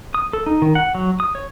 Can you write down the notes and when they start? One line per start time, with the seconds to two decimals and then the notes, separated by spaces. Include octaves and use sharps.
0.14 D#6
0.33 A4
0.46 D#4
0.62 D#3
0.75 F#5
0.95 F#3
1.20 D#6
1.35 C#5